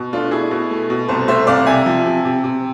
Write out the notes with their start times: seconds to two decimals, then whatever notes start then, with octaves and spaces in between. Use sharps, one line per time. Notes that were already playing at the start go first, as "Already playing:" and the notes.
Already playing: B2
0.13 A3 D4 F4
0.31 B2 E4 G#4
0.51 B2
0.71 A3
0.90 B2
1.08 C2 A4 C5
1.28 A3 C5 E5
1.47 C2 D5 F5
1.66 C3 E5 G#5
1.86 F3
2.06 C3
2.25 C3
2.44 C3